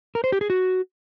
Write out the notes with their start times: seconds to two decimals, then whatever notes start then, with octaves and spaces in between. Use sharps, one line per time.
0.15 A#4
0.24 C5
0.32 G4
0.41 G#4
0.50 F#4